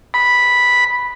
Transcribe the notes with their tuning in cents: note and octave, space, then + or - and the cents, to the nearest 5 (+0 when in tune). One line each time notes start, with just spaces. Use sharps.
B5 -5